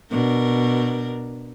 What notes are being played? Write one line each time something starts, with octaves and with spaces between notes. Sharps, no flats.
B2 D4 A#4